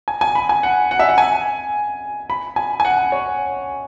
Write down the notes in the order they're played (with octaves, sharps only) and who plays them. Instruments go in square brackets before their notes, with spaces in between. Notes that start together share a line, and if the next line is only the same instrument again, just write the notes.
[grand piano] G#5
G#5
B5
G#5
F#5
F#5
E5
F#5
G#5
B5
G#5
G#5
F#5
C#5